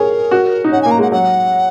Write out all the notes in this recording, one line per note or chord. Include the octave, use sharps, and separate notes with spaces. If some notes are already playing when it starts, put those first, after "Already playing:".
Already playing: G#4 A#4 C#5
F#4
D#4
C#4 F#5
A#3 G#5
A#5
G#3
F#5
F#3 F#5